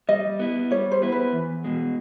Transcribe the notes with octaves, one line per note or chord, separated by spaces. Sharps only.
G3 D#5
B3 E4
G3 C#5
C5
B3 E4
B4
E2
B2 G#3